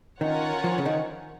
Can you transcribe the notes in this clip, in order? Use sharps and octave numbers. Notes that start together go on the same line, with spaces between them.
D#3 C#4 F4 A#4 C#5 F#5
F3
C#3
D#3